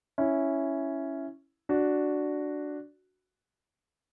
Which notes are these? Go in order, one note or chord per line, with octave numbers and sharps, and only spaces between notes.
C#4 E4
D4 F#4